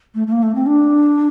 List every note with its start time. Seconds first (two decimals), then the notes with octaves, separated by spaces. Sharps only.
0.14 A3
0.27 A3
0.32 A#3
0.43 A3
0.55 C4
0.66 D4